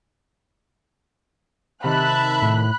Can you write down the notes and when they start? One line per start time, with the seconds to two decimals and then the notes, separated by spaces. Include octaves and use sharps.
1.84 C3 D#3 E5 A5 B5 F#6
2.42 A2